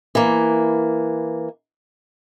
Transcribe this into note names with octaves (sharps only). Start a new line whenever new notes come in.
E3 A#3